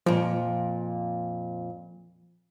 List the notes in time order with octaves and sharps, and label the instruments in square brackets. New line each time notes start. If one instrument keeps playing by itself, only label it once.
[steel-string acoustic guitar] F2 A#2 [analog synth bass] F3